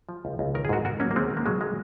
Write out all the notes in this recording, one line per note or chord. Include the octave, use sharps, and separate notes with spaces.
F3
C#2
C#2
D#3 A#4
G#4
G#2 F#4 A#4
G#2 F#4 A#4
F#3 A#3 C#4
A#3
D#2 G#3 C4
D#3
A#3
F#3 G#3
F#3 G#3